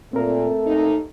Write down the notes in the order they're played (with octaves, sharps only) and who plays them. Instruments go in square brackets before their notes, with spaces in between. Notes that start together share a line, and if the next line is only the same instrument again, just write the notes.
[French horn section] A#2 [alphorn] A3 [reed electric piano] C4 A#4
[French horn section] D#2 D#4